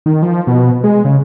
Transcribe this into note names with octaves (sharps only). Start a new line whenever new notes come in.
D#3
F3
B2
G#3
C#3